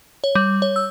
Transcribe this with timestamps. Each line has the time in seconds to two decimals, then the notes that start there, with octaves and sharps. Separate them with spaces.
0.24 C#5
0.35 G3
0.62 C#5
0.76 E6